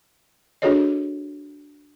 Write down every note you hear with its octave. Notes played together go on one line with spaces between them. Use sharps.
D4 F#4 G#4 A4 C#5 D#5